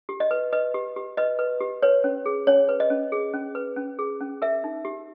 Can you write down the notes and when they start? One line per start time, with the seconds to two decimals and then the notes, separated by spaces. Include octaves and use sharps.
0.09 G4
0.20 D#5
0.31 B4
0.53 B4 D#5
0.74 G4
0.96 G4
1.17 B4 D#5
1.39 B4
1.60 G4
1.82 B4 C#5
2.04 C#4
2.26 G#4
2.47 C#4 C#5
2.69 B4
2.80 D#5
2.90 C#4
3.12 G#4
3.34 C#4
3.55 B4
3.76 C#4
3.99 G#4
4.21 C#4
4.42 A#4 E5
4.64 D#4
4.85 G4